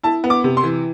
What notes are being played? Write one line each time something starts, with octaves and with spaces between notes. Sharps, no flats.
E4 A5
B3
D6
C3
C6
E3